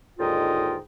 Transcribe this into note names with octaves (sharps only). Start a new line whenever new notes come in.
D#2 G#2 D3 F4 D#5 G5